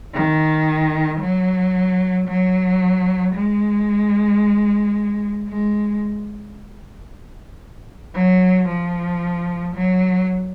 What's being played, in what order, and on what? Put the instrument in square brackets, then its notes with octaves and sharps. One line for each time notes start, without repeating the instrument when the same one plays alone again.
[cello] D#3
F#3
F#3
G#3
G#3
F#3
F3
F#3